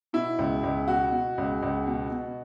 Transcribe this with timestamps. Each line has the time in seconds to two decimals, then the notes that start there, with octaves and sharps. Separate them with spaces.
0.13 B2 E4
0.39 C#2
0.63 C#2
0.88 B2 F#4
1.12 B2
1.38 C#2
1.62 C#2
1.87 B2
2.11 B2